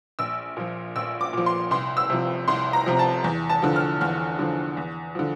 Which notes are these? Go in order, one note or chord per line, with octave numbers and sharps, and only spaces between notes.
A#1 E6
A#2 F3
A#1 E6
D6
A#2 F3
C6
C2 C6
E6
C3 F3
C2 C6
A#5
C3 F3
A5
E2
A5
D3 F3
F6
E2 F6
D3 F3
E2
D3 F3